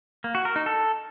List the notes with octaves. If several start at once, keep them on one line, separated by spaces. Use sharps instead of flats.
A#3
F#4
A#4
D#4
A4